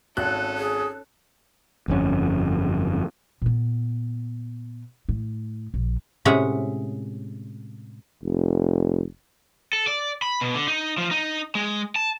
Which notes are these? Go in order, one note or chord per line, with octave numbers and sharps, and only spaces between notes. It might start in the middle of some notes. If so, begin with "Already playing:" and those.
G#1 C#4 A4 F#6
G#4
G1 F2 C3 C#4
A#2 B3
A2
A#1
A2 C3 G#3 C#4 E5 F#5
F1
A4
D5
B5
B2
D3
D#4
F3
D#4
G#3
A5